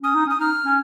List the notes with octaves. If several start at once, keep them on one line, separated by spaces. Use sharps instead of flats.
C#4 D#6
D#4
C#4
D#6
D#4 F6
C#4